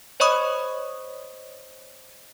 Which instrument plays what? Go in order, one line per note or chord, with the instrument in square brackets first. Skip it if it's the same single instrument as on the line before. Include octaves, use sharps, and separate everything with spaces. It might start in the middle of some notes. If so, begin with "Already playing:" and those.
[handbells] C5 C#5 D#5 B5 C#6 D#6